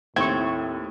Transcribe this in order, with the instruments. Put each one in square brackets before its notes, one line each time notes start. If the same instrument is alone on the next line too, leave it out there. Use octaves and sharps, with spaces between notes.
[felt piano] D#2 E4 [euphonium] A2 [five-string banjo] C4 [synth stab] C#6 G#6